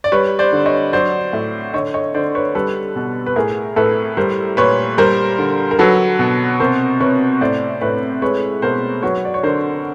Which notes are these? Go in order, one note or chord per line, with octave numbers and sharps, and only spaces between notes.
D5
G3 B4 C#5
C5 D5
D3
C#5 D#5
F#3 C5 D5
A2
D3 C#5 D#5
C#5 D#5
D3 C5 D5
B4 C#5
G3 A4 B4
B2
B4
A2 G#4 A#4
A2 A4 B4
G3 A#4 C5
A#2 B4 C#5
G3 A#4 C5
D3
A#4
F#3 A4 B4
B2
C3 A#4 C5
C3 B4 C#5
A2 C5 D5
A2 B4 C#5
G#3 B4 C#5
B2 A#4 C5
F#3 B4 C#5
D5
C#5
D3 A#4 C5